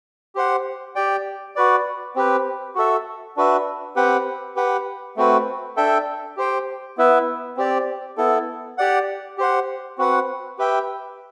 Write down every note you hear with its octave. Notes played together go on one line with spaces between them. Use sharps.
G4 C5 F#5
G4 D5 G5
F#4 B4 D5
C4 G4 B4
F#4 A4 E5
D4 F#4 B4 E5
C4 G4 B4 F#5
G4 B4 F#5
A3 C4 F#4 B4
D4 A4 E5 G5
G4 C5 G5
B3 E4 B4 E5
C4 G4 D5
B3 E4 A4
G4 D5 F#5
G4 C5 F#5
C4 F#4 B4 F#5
G4 B4 E5 G5